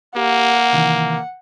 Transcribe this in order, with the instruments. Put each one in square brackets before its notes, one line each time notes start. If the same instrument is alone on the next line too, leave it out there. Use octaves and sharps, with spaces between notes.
[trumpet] A#3 [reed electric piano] G4 [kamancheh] F#5
[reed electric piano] C3 D#3 E3